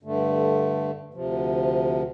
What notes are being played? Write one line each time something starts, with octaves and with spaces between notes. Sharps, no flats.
G2 D3 A3
D2 C3 F3